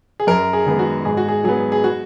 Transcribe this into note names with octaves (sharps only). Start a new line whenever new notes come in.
G#4
F#2 A#4
G#4
D#3 G#3 B3
F#4
G#2 G#4
F#4
G#4
F#3 B3 G#4
G#4
F#4